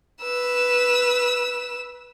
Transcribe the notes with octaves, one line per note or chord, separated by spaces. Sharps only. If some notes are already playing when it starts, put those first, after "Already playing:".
B4 E6